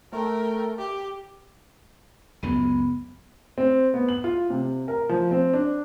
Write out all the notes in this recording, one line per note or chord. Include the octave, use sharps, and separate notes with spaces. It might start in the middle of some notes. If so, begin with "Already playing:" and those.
A3 A#4 G5
G4
C#2 F#2 G#3 B3
C4
B3
F#7
F4
C3
A#4
F3
C4
D4